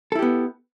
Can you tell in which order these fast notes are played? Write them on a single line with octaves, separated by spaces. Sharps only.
A4 E4 G4 B3